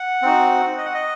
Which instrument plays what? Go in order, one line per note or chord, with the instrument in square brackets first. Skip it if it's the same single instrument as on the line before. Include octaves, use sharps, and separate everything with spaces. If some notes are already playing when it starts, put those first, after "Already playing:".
Already playing: [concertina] F#5
C4 D#4 F#4
D#5
F#5
D#5